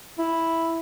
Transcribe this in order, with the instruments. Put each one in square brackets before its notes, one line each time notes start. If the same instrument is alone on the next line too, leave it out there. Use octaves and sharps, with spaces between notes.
[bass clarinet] E4